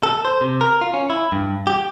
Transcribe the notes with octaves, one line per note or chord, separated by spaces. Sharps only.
A4
C5
C3
A#4
F4
C#4
E4
G2
G4